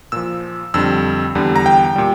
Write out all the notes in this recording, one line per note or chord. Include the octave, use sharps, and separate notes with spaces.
A#2 F3 E6
F2 D3 G3 E6
E2 D3 G3
A#5
G5
A#2 G3